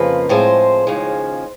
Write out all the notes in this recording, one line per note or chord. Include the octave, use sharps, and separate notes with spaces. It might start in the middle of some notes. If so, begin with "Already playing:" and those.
Already playing: F2 C#3 F3 A#3 B4
A2 F3 G#3 C4 C5
D#2 C#3 F3 G#3